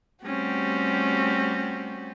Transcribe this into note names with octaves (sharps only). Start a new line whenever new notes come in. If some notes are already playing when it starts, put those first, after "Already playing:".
G3 A3 C4 C#4 F#4 G4